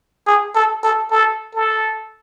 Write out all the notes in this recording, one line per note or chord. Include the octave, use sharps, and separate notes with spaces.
G#4
A4
A4
A4
A4